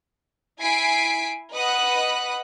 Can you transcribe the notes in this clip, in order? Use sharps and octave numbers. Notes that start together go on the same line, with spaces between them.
E4 G#5 B6 C7 D7
B4 D#5 F#5 B5 D#6 F#6